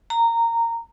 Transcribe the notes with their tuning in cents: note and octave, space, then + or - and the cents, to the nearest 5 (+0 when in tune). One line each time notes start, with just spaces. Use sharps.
A#5 -15